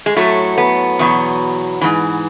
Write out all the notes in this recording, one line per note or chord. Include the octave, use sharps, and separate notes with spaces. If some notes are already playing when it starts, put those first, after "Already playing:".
G#3
A2 F#3 A3
B3
E2 B2 F#3
G#2 E3